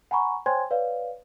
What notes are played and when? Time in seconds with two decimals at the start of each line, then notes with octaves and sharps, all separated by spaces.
0.11 F#5 G#5 A#5 B5 C#6
0.46 C5 C#5 G5 G#5 C6 G#6
0.71 B4 C#5 D5 F5